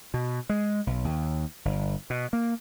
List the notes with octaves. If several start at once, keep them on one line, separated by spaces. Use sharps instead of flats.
B2
G#3
B1
D#2
G1
B2
A#3